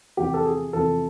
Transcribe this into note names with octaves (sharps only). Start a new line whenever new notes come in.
E2 C3 F3 G4
A4
G#4
E2 C3 F3 A4